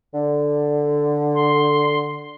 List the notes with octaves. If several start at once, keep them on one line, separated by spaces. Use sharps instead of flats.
D3
C6